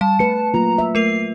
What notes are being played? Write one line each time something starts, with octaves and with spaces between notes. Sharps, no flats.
G3 F5 A5
A3 B4 C#7
F#3 A#3 F4 A#5
E5
A3 A#4 C7 F7